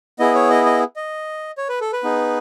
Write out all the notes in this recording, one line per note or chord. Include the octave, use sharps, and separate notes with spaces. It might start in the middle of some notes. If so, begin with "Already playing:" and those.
B3 E4 G#4 D#5
C#5
D#5
D#5
D#5
C#5
B4
A4
B4
B3 D#4 G#4